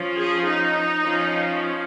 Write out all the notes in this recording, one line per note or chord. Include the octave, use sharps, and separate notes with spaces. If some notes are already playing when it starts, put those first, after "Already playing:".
Already playing: F3 C#4
G#4
D#4
F3 C#4